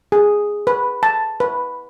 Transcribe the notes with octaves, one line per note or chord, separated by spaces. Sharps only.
G#4
B4
A5
B4